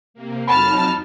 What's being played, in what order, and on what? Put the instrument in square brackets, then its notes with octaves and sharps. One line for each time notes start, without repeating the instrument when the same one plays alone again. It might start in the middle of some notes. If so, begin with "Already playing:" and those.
[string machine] C3 A#3
[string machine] F2 F#3 D#4 [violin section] A5 F6 [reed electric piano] B5